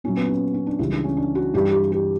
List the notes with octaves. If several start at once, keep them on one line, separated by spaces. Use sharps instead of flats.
A#2 F#3 C#4
B3
C#4
C#4
D4
C#2 C#3 E3 G3 E4
D4
C#4
D4
F#4
G2 E3 G3 G4
G4
G4